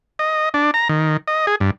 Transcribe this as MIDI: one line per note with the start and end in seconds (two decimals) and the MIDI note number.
0.19 0.49 75
0.54 0.71 62
0.74 0.88 82
0.89 1.17 51
1.28 1.46 75
1.47 1.55 68
1.60 1.70 43